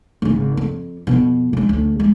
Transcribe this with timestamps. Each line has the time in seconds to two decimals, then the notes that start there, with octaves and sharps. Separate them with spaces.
0.22 G#1 C#3
0.57 F2
1.07 F2 B2
1.53 G#3 C#4
1.69 D2
2.00 G#3